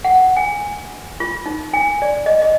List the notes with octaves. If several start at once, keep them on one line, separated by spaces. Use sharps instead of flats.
F#5
G#5
F4
D#4
G#5
D5
D#5
D#5